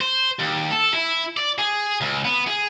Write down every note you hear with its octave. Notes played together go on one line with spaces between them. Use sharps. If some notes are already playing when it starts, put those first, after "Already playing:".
C5
D#2
A4
E4
D5
G#4
C#2
B3
G#4